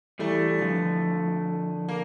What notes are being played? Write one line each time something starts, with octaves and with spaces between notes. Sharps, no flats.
E3 G3 A3
D3 F3
A#3